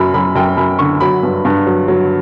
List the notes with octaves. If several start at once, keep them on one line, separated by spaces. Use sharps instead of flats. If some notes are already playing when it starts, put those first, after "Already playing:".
Already playing: F#2 F#3 B5
F#2 B5
F#2 G5
F#2 B5
D3 C#6
F#3 B5
G2
G2
F#3
F#3